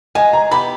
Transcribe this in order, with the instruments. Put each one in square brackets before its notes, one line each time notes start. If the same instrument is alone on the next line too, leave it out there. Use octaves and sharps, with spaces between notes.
[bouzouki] G#3 [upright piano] G#5
[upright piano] A#5
[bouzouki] B3 E4 G4 [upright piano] B5